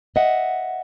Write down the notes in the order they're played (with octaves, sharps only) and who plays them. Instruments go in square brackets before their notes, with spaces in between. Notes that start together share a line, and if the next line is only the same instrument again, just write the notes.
[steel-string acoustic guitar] D#5 E5 F#5